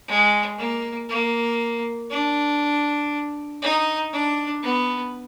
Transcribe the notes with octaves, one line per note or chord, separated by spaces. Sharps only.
G#3
A#3
A#3
D4
D#4
D4
B3